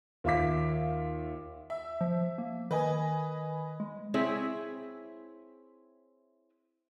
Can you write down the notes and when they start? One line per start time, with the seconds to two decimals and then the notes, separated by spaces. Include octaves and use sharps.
0.24 D#2 F4 E5 F5 D6 B6
1.70 E5
2.01 F3
2.38 A#3
2.71 D#3 B4 D#5 G#5
3.80 G#3
4.14 C4 E4 G#4 C#5 E5